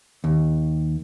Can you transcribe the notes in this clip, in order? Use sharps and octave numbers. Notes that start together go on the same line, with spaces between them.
D#2